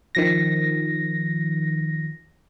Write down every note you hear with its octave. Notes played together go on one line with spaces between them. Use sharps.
D#3 F3 A#6